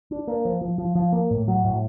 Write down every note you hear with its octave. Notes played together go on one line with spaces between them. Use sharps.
D4
A#3
F3
F3
F3
F3
A#3
A2
F#3
A2